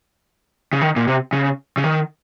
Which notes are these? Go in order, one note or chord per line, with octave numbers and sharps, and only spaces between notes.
C#3
D#3
A#2
C3
C#3
C#3
D#3